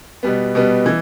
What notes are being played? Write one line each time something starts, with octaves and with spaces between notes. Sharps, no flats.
B2 G3 B3
B2 G3 B3
E3